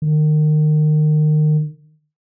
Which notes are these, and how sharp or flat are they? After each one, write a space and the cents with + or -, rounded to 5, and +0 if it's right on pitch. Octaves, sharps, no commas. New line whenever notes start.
D#3 -30